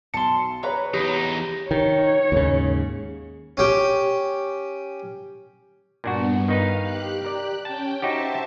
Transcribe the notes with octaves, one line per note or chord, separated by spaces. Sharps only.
B1 A5 C6 C#7
G#4 B4 C#5 A#5 B5
E2 D#4 G4
D#3 C#5
D#2 G#2 C#3
C#4 G4
G2 A#2 B3 D4 F#4
D#3 D#4 B4 F5
G4 F#6
A#4 D5
C#4 G5 A5
D#4 F#4 G4 C5 E5 A5